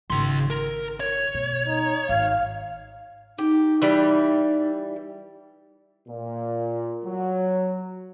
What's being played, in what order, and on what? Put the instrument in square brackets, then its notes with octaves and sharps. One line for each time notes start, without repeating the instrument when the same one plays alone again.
[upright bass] G#1 [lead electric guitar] C#3 C6
[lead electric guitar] A#4
C#5
[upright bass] B2
[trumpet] D#4
[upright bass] G#1 [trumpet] F5
[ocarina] D#4 [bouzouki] G4
[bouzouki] E3 G3
[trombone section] A#2
F#3